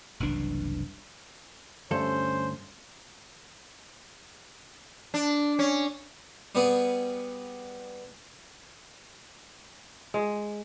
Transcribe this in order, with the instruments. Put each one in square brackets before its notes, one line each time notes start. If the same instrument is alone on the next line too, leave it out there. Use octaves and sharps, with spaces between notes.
[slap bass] F#1 C2 E3 D4
[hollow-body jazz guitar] D2 G2 A4 [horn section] C#4 C5
[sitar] D4
C#4
[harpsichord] G3 B3 G#4
[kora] G#3